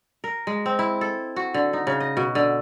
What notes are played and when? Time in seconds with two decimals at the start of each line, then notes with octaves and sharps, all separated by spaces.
0.24 A#4
0.47 G#3
0.66 C4
0.79 E4
1.01 A4
1.36 F#4
1.54 D3
1.73 D#4
1.87 C#3
2.00 D#5
2.17 B2
2.35 D3